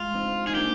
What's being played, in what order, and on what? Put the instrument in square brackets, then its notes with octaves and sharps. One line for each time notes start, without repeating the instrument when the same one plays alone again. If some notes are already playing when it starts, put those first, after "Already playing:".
Already playing: [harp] G#3 [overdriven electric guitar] F4
[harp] C4 D#4
[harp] D#4 [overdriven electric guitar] G#4
[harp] A#3 D4 [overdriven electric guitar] G4